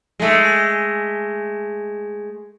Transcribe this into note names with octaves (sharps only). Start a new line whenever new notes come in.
G#3 A3